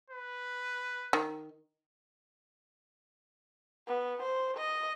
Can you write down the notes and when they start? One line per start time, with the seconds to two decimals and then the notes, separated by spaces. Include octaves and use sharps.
0.10 B4
1.13 D#3
3.88 B3
4.23 C5
4.57 D#5